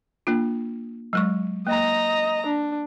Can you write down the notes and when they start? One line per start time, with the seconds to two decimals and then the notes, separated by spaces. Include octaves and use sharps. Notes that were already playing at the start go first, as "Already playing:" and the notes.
0.27 A#3 D4 F4
1.13 F#3 G#3 C#6
1.67 A#3 D#5 A#5
2.46 D4